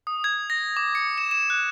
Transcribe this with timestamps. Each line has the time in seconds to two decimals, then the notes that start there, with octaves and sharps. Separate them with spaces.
0.07 D#6
0.24 G#6
0.50 A#6
0.77 D6
0.95 C#7
1.18 E7
1.31 E7
1.50 F#6